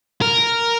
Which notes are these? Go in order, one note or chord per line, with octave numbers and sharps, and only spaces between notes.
A#4